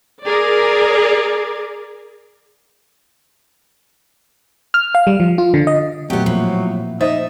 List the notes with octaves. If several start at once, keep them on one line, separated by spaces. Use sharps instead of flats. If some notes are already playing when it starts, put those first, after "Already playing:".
G#4 A#4 D5
F6
F5
G3
F3
F4
D3
D#5
A#2 F#3 A3 B3 C4 G4
A2 F3 A#3
D#4 C5 E5